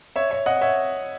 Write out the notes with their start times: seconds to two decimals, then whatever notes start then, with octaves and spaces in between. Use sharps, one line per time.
0.16 C#5 E5
0.31 C#5 E5
0.46 D#5 F#5
0.61 C#5 E5